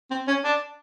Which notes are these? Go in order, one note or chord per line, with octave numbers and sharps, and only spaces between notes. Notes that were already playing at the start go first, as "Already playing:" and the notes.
C4
C#4
D4